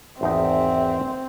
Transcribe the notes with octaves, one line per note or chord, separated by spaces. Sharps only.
G#1 E2 C4 D#4 E5